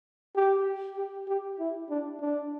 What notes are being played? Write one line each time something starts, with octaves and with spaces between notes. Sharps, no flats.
G4
G4
G4
E4
D4
D4